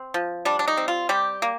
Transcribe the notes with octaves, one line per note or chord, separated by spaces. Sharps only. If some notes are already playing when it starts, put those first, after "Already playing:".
Already playing: C4
F3
G3 D4
D4
D#4
C4
F4
G3 G4
A#3